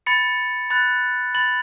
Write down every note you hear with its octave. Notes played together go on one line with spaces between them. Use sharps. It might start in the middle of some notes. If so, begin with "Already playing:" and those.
B5 A6 C#7
B5 F#6 A6
B5 A6 F#7